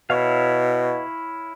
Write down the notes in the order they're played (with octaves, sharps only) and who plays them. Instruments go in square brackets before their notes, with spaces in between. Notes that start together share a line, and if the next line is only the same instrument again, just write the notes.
[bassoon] B2 [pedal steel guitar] E4 C#5 F5